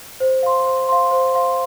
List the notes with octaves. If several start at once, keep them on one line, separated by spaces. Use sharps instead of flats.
C5
F5 C6
C5
F5 C6
C5
F5 C6